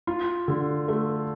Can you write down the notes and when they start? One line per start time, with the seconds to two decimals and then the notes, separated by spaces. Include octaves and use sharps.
0.07 F4
0.48 D3
0.88 A3